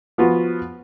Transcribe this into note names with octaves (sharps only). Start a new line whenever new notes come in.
F3 B3 F4 F#4